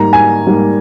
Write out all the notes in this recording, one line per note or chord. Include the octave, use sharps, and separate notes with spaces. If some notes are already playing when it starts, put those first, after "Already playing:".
Already playing: G#2 G3 A#3 A#5
G#5
G#2 G3 A#3